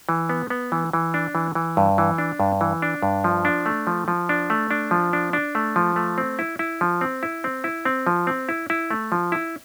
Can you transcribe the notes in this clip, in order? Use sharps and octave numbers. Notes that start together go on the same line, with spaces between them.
E3
B3
B3
E3
E3
D4
E3
E3
G2
E3
D4
G2
E3
D4
G2
F3
D4
A3
F3
F3
D4
A3
D4
F3
D4
D4
A3
F3
A3
C4
E4
E4
F3
C4
E4
C4
E4
C4
F3
C4
E4
E4
A3
F3
E4